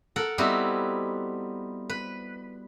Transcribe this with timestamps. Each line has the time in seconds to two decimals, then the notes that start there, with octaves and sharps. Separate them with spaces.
0.16 A4 A#4 F#5
0.38 G3 B3 C4 D#4 E4 F#4
1.90 B4